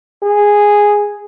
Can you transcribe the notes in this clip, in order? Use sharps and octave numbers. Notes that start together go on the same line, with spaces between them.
G#4